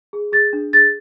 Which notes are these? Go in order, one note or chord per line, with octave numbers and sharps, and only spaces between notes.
G#4
G#4 A6
D4
G#4 A6